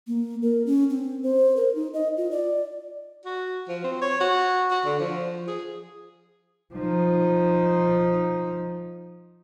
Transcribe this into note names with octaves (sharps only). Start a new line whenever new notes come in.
A#3
A#4
C#4
C4
C5
A#4
D#4
D#5
F4
D5
F#4
F3
C4
C#5
F#4
F#4
D3
F3
G#4
F3 D#4